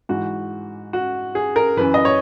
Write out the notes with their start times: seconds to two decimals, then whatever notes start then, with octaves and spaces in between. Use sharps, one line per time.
0.09 G#2 E3 F#4
0.93 F#4
1.35 G#4
1.56 A#4
1.77 F#2 E3 B4
1.94 D#5
2.05 C#5